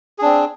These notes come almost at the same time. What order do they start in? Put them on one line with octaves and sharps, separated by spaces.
G#4 D4 C4